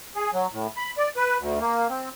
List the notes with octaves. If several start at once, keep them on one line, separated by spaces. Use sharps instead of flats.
G#4
F#3
A2
B5
D5
B4
D2
A#3
C4